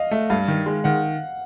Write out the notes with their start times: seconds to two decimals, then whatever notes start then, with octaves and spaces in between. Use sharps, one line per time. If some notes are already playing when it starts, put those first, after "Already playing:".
Already playing: D#5 F5
0.11 A3 E5
0.30 G2 F5
0.48 D#3
0.66 G#3
0.84 D#3 F#5